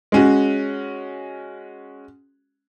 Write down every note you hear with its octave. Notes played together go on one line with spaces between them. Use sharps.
G#3 C#4 F#4